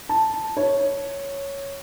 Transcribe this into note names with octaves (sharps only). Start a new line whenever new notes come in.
A5
C#5